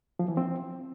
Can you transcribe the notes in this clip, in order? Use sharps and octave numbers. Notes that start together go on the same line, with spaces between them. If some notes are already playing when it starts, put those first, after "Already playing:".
F3
E3
C4